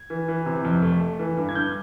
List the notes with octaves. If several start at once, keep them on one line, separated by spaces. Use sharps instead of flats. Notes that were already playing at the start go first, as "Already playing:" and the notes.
Already playing: G#6
E3
E3
C3
F2
A3
A3
E3
G2
G#6
G2 G6